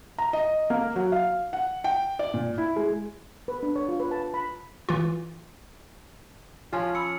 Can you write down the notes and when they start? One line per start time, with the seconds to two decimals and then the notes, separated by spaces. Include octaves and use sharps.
0.19 A#5
0.33 D#5
0.70 A#3
0.96 F#3
1.12 F5
1.53 F#5
1.84 G5
2.19 D5
2.34 A#2
2.58 E4
2.76 G#3
3.48 B4
3.63 D4
3.76 C#5
3.89 F4
4.00 B4
4.11 A5
4.34 B5
4.89 E3 F4
6.72 F3 C#4 F4
6.95 B5 E6 C#7